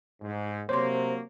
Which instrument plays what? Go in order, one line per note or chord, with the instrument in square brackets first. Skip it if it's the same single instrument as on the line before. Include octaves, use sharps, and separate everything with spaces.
[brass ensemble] G#2
[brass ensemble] C3 F#3 A#3 [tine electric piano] C5 [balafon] C#5 C6